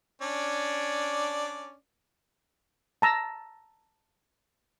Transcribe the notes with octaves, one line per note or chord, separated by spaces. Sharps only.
C#4 D4 D5
A5 A#5 E6